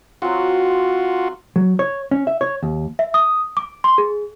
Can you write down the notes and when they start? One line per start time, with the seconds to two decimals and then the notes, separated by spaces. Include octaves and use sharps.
0.22 F#3 C4 F4 F#4
1.56 F#3
1.79 C#5
2.11 C#4
2.27 E5
2.41 C#5
2.63 D#2
2.99 E5
3.14 D#6
3.57 D6
3.84 C6
3.98 G#4